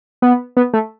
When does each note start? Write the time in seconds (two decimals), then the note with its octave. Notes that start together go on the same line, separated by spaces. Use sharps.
0.22 B3
0.57 B3
0.74 A3